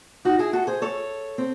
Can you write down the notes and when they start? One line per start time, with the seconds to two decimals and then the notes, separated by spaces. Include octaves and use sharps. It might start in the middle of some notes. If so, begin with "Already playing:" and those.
0.25 D#4 F#4
0.39 E4 G#4
0.53 F#4 A4
0.67 G#4 C5
0.82 A4 C#5
1.38 C4